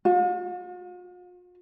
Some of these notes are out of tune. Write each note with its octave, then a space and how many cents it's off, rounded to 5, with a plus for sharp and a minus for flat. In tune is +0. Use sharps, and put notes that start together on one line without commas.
F4 +45